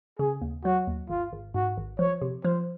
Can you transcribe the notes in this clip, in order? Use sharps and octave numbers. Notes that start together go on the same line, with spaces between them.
C#3 G#4
D#2
F#3 F#4
D#2
G#1 F4
G#1
G#2 F#4
G#1
F3 C#5
C3
F3 C5